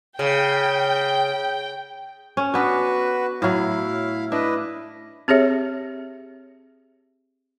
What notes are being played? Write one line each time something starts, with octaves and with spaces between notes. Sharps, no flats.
C#3 G5
C#4
B3 D4 F#4 B4
A2 F#3 E4 F5
D4 E4 B4 D#5
C4 G4 G#4 C#5 E5